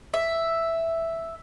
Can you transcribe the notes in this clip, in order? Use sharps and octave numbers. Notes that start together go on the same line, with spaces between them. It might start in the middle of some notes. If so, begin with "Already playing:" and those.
E5